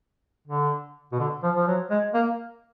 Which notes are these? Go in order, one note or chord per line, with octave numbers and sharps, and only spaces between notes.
D3
B2
D3
F3
F3
F#3
G#3
A#3